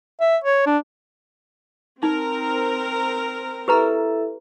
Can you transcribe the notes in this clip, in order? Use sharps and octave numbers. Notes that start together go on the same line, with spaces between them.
E5
C#5
D4
C4 D#4 A#4
E4 G4 A4 B4 E5 A#5